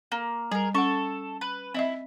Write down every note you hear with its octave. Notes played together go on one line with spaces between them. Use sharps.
A#3
G3 G#4 A#4
C#4 A4 F#5 C#6
B4
C4 E4 D#5 E5